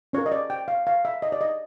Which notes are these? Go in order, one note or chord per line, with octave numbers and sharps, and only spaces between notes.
C#4 F4 A#4 C#5
D#5
D5
G5
F5
F5
E5
D#5
D5
D#5